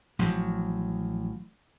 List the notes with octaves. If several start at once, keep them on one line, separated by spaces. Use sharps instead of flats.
A1 F3 F#3